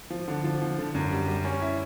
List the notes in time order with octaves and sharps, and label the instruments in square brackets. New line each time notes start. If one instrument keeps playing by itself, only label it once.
[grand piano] F3
D3
F3
F3
D3
F#2
G3
G3
C#4
E4